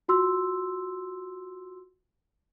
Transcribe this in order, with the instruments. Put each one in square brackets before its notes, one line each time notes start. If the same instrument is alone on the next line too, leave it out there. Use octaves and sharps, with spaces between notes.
[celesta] F4 F#4 C6 E6